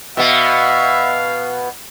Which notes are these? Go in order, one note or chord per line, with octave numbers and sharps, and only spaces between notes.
B2 B3 E5 F5